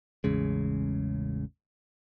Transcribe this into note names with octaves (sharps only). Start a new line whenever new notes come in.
A1 E2 C#3 G#3